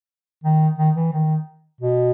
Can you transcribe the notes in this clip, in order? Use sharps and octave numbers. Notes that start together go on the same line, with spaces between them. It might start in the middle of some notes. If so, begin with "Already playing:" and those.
D#3
D#3
E3
D#3
B2